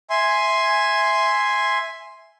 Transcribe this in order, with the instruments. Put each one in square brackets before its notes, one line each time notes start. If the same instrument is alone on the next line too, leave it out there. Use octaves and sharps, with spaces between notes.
[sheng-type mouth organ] E5 G#5 C6